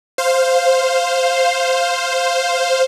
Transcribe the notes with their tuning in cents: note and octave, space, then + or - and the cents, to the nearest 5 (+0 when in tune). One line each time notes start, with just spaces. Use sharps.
C5 +0 F5 +0